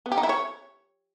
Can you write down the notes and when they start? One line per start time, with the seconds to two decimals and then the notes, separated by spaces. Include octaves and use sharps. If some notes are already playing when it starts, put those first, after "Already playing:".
0.06 B3
0.12 G4
0.17 D#4
0.23 E4
0.29 C#5